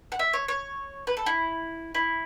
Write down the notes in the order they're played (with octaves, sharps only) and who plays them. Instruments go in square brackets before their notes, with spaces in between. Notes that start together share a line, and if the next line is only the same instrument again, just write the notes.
[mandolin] F#5
E5
C#5
C#5
B4
A4
E4
E4